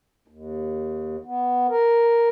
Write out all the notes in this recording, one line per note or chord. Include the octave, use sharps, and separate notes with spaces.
D#2
B3
A#4